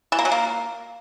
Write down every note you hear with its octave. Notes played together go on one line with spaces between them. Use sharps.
E3
A#3
F#3
A#3